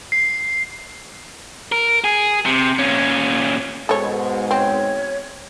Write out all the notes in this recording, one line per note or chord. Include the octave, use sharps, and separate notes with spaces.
C7
A#4
G#4
C3
A#2 C#4
G#2 B2 G#3 A4 C#5
C4 C#5